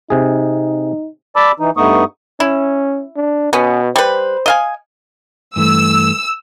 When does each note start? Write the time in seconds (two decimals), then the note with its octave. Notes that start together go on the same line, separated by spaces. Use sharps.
0.10 C3 D#4 G#4
1.36 D5 A5 B5 D6 E6
1.60 E3 D#4
1.77 G2 A3 B3 D#4 C#6 D#6
2.40 C#4 E4
3.16 D4
3.53 B2 B3 C#4
3.96 G3 B4 C5
4.46 D#5 F5 G#5
5.56 G2 E3 A3 E6